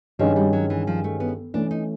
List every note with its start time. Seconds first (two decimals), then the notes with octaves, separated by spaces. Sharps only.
0.19 G2 D#3 F3 G#3 C#4
0.36 G3
0.53 F#3
0.70 E3
0.87 F3
1.04 A3
1.20 B3
1.54 E3 A3 C#4 D4
1.71 D#4